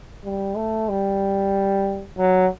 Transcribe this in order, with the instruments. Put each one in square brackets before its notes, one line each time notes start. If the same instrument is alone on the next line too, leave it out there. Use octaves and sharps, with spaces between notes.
[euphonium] G3
A3
G3
F#3